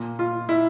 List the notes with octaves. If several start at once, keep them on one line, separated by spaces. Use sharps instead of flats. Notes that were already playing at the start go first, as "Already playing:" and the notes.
Already playing: A#2
F4
E4